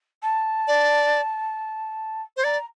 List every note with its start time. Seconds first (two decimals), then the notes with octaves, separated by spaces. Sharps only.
0.22 A5
0.68 D5
2.37 C5
2.44 D5 A#5